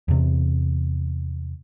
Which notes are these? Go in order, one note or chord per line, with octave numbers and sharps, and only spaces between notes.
E2 C3